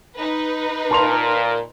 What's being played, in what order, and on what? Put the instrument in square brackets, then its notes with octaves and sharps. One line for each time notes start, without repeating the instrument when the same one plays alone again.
[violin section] D#4 B4
[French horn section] A#2 [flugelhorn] A#4 [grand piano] A5 C6 F7